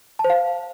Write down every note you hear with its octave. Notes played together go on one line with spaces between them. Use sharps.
A5
C5
F5